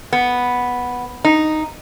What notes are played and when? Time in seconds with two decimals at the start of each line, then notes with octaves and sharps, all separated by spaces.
0.13 B3
1.25 D#4